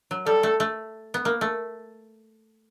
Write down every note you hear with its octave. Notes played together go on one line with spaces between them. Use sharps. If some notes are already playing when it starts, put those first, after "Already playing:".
F#3
G3 A4
A3
A3
B3
A#3
A3